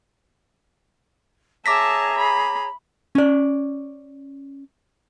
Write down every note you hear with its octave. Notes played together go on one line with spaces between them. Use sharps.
G#4 C#5 E5 A5 A#5 D6 A#6 B6
B5
C#4 D5